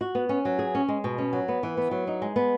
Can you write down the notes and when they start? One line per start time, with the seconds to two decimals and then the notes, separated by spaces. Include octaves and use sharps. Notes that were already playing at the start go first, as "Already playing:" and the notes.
0.01 F#4
0.15 B3
0.29 C#4
0.45 F#3
0.59 G#4
0.75 C#4
0.88 G#3
1.04 B2
1.18 C#4
1.33 F#3
1.48 B3
1.63 E3
1.77 B3
1.91 F#3
2.07 D#4
2.22 G#3
2.36 B3